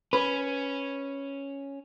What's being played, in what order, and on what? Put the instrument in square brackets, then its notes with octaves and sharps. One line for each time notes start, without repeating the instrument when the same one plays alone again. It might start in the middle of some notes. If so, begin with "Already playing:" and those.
[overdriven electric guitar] C#4 [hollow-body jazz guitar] B4